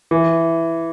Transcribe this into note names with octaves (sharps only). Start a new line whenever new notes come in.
E3